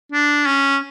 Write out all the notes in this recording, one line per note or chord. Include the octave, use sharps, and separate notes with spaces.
D4
C#4